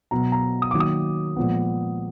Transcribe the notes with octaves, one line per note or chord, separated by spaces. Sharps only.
B2 F#3 B3 A#5
A#5
D#6
D#3 F#3 A#3 D6
D#6
A#2 F3 G#3 B3